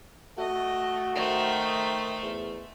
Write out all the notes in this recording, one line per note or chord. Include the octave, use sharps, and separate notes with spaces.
A3 F#4 D#5
D#3 A3 C5
E2